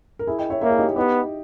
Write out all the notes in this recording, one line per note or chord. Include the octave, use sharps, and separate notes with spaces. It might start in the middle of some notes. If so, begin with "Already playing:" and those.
A#4
E4 G#4
D#5 G5
C#5 E5
A#3 C#5 E5
E4 G#4
D#4 G4
B3 D#4 G4